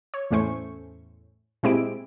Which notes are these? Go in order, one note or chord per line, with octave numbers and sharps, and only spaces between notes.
C#5
E2 A2 A3 C#4 C5 C#6
A#2 G#3 C4 E4 G4 D7